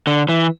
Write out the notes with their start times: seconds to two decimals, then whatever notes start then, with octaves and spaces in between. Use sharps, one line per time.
0.07 D3
0.29 E3